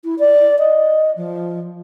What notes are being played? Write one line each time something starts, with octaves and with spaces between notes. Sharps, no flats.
E4
D5
D#5
F3